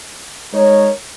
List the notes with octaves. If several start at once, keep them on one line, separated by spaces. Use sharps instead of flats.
G#3 D#4 A#4 C#5